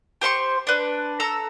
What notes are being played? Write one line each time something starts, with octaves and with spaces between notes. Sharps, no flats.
G4 C5 C6 C#6
D4 B4
A4 A#5 E6